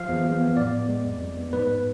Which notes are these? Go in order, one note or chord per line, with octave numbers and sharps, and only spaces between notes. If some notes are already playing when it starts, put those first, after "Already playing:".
Already playing: F3 F5
E2
E2
B3
A2 D5
B3
G#3
F2
F2
B3
G#2 B4